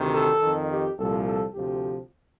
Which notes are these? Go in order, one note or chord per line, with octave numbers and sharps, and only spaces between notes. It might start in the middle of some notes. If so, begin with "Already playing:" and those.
Already playing: D2 C3 D#3
A4
F2 D#3
G4
C2 A#2 F3 A4
A4
D2 C3 F3 G4